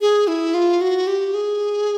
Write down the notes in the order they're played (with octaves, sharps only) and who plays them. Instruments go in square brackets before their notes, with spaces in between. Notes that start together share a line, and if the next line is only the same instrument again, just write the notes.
[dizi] G#4
E4
F4
F#4
G4
G#4